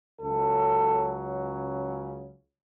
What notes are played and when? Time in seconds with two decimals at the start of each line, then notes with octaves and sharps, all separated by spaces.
0.21 C#2 C#3 F#3 A4